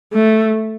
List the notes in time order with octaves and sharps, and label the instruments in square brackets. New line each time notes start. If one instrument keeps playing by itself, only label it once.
[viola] A3